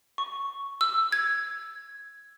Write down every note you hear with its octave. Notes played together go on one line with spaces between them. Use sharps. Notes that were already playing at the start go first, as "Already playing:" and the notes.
C#6
E6
G#6